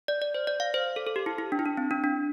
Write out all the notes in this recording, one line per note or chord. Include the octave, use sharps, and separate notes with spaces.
D5
D5
C5
D5
F5
C5
A4
A4
G4
E4
E4
D4
E4
D4
C4
D4
D4